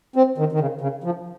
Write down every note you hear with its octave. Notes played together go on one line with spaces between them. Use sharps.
C4
D#3
D#3
C#3
C#3
F3